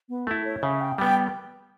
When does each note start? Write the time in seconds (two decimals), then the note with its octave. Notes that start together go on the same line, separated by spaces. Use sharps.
0.09 B3
0.27 A3 E4 A4
0.44 C#5
0.63 C#3 E5
0.81 G5
0.98 G3 B3 G5